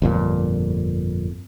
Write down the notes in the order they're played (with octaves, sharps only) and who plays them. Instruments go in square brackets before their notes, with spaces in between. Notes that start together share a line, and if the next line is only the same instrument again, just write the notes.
[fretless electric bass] G1 F2 A#2